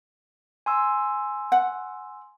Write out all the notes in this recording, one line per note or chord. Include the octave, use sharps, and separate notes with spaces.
G#5 C6 E6
F#5